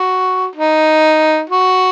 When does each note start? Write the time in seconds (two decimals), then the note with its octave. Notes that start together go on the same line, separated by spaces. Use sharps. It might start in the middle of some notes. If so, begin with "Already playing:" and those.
Already playing: F#4
0.56 D#4
1.50 F#4